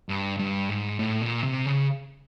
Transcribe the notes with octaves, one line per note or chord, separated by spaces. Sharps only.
G2
G2
G#2
A2
A#2
C3
C#3